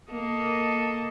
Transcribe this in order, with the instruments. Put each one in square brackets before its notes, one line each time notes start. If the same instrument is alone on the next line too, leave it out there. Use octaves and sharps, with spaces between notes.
[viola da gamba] A#3 A4 D#5